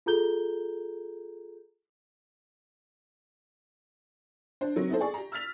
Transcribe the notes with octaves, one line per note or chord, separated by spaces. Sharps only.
F4 G#4 A4 A#5 G6 G7
D4 C5
D#3 F#3 C4
B3 D#4 E4 A4 C5
G#4 D5 C#6
G4 A#5
E6 F6 A6 B6 F7